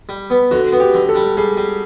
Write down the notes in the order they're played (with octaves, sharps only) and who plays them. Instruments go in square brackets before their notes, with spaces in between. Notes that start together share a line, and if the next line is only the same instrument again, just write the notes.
[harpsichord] G3
B3
[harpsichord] D3 [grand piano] F#4
[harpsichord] B3
[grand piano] G4
[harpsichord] D3
[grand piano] A4
[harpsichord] G3
[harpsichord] G3 [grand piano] G#4
[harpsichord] G3